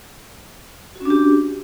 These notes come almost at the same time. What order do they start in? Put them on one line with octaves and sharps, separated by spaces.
F#4 C#4 D4 G4